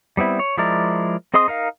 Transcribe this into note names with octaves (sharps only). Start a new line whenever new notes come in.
G3 B3 C4 E4
C#5
F3 G#3 E4 A#4 D5
C4 G#4 D#5 C6 D#6
D#4 A#4 F5